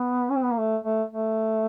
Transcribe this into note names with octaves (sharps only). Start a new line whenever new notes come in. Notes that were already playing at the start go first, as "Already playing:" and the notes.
Already playing: B3
C#4
C4
B3
A#3
A3
A3
A3